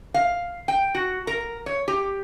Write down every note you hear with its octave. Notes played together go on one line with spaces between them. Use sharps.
F5
G5
F#4
A#4
C#5
G4